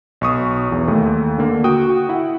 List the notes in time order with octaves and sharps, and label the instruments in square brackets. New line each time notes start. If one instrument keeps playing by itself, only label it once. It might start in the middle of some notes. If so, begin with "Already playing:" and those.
[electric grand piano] B1 C#6 D#6
E2 E3
D#2 A3
D3 A#3
F#4 G5 D#6
E4 F#5